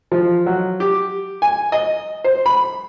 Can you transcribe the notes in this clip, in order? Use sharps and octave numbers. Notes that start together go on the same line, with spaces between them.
F3
F#3
G4
G#5
D#5
C5
B5